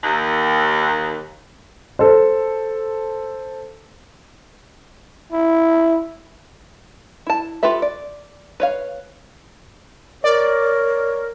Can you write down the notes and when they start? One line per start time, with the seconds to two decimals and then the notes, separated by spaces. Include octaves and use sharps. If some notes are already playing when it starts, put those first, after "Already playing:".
0.04 D#2
1.99 A4 C5
5.32 E4
7.27 E4 A5
7.63 F4 G4 A4 B4 E5
7.82 D5
8.60 B4 C#5 F5
10.24 A#4 C#5 D5